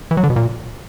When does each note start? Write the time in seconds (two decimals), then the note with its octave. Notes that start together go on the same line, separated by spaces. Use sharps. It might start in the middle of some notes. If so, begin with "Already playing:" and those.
0.11 E3
0.17 F#3
0.23 D3
0.30 B2
0.36 A#2